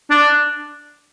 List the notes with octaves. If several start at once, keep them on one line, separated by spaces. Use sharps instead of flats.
D4